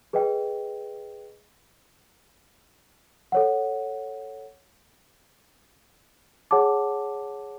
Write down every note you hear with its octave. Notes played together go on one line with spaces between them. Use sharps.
G#4 B4 D#5 G5
A4 C#5 F#5
G#4 C#5 F#5 A5 D6